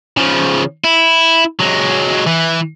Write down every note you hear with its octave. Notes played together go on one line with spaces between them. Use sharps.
C#3 F3
E4
F#3 G#3
E3